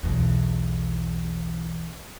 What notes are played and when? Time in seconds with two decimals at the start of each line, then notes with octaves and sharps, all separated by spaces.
0.03 B1 E2